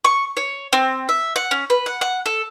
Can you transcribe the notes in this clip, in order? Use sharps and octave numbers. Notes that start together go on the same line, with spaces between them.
C#6
C#5
C4
E5
F#5
C#4
B4
F#5
F#5
A4